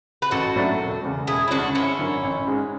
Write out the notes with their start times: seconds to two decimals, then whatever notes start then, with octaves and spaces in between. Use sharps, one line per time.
0.22 B4
0.31 A1 F#4 A4
0.56 A2 F#3 A3 D4
0.80 E1
1.03 E2 C#3
1.27 E1 E4 G#4
1.48 E4
1.51 D2 C#3 G#3 C#4 D4 F#4
1.75 G#1 C#4 E4
1.99 F#2 D3
2.23 A1
2.47 G#2 G#3 C#4